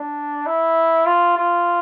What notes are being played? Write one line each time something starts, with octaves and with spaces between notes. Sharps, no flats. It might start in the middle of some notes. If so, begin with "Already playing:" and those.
Already playing: D4
E4
F4
F4